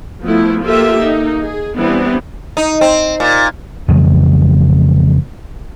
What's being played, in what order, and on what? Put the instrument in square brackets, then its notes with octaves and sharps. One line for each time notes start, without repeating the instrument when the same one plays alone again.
[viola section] F3 A3 B3 E4
A#3 F4 G4 A4 E5
A#3 D#4
G#4
E3 G3 B3 C4 D4
[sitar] D#4
C4
A#2
[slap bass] F2 C#3 E3 G#3